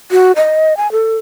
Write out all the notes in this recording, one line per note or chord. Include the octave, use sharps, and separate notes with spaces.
F#4
D#5
G#5
A4